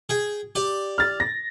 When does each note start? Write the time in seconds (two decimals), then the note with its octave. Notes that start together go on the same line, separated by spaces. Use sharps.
0.09 G#4 G5
0.55 G4 D5
0.98 F6 A6
1.20 A#6